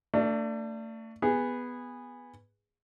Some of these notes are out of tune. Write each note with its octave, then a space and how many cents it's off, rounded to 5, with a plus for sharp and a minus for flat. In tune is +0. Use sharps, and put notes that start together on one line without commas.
A3 +35 D4 +0
B3 +0 G#4 -15